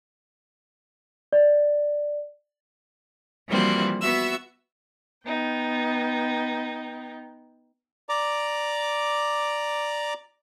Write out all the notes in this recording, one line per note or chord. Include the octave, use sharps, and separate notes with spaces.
D5
E3 F3 G3 A#3 C4 F#4
B3 F#4 E5 E6
B3 D#4 G5
D5 A#5 D6